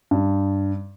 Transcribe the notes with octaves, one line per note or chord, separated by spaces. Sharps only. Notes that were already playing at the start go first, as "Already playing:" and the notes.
G2